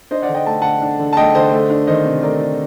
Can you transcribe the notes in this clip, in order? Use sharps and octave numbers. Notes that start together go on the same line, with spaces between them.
D4 C5 D#5
D5 F#5
D3
D#5 G5
A3 A5
D3 F#5 A5
D4
D3
A5
A3 D#5 G5
D3 C5 D#5
A3
D4
D#3 C5 D#5
C3
A3 A#4 D5
D4